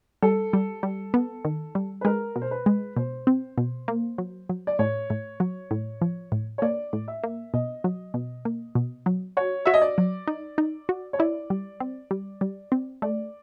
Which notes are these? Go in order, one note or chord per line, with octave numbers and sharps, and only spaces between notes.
G3 A4
G3
G3
B3
D#3
G3
B4
G#3 A#4
B2
C5
B4
G#3
B2 C5
C4
B2
A#3
F#3
F#3
D5
A2 C#5
A2
F#3
A2
F3
A2
C#5
A#3 D5
A2
E5
A#3
B2 D#5
F#3
B2
A#3
B2
F#3
F#4 C#5
F#4 E5
D#5
D5
F#3
D#4
D#4
F#4
C#5
E4 D5
G3
C4
G3
G3
C4
A3 D5